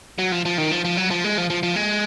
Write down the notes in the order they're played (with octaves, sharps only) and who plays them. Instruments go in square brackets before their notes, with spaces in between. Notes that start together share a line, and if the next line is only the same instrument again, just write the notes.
[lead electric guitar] F#3
F3
F3
D#3
F3
F3
F#3
F3
G#3
F3
F3
F3
G#3